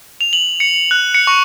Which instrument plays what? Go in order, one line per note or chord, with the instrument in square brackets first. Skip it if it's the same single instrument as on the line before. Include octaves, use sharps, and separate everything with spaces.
[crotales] F7
F#7
C#7
F#6
C#7
C#6